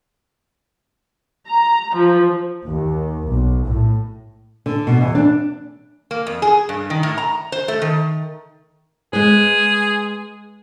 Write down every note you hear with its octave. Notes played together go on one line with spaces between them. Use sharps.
A#5
F3
D#2
B1
A2
D3
B2
E2
D4
A#3
F2
G#4
G2
D#3
A2
A#5
C5
A3
D#3
G#3 G#4 B4